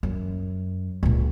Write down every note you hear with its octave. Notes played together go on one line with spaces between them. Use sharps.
F#2
C#2 A#2